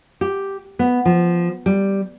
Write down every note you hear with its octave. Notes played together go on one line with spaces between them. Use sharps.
G4
B3
F3
G3